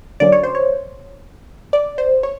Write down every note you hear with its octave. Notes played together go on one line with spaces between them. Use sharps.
D3 F#3 A#3 C#4 D5
C#5
C5
C#5
D5
C5
C#5